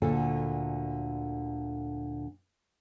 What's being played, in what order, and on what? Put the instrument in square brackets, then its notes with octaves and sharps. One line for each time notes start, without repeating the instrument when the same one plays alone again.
[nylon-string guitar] D2 A#2 D3 A4